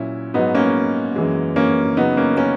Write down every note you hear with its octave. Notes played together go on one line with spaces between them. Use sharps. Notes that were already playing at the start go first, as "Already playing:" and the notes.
Already playing: A#2 F#3 C#4 E4
G#2 F#3 B3 D#4
A#3 C#4
F#2 E3 G#3
A#3 C#4
F#2 C#3 F#3 B3 D#4
A#3 C#4
A#3 C#4